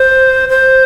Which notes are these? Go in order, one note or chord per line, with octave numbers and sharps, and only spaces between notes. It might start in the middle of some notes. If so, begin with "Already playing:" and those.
Already playing: C5
C5